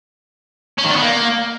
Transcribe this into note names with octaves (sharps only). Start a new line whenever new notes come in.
C#4
D#3
D4
B3
A#3